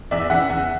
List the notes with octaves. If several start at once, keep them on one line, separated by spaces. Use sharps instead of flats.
E2 D5 E5
C#3 E3 E5 F#5
E2